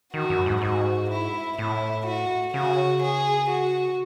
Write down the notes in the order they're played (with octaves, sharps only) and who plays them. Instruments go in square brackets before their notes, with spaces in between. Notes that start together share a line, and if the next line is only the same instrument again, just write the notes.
[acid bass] D#3 [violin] F#4
[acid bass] F#2
G#2
[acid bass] G#2 [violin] F#4
[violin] E4
[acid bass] A2 [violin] E4
[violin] F#4
[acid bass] C#3 [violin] F#4
[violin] G#4
F#4